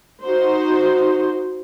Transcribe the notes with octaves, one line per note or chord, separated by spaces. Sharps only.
D#4 F#4 C5